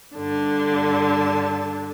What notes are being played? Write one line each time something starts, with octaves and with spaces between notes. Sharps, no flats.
G2 D3 A5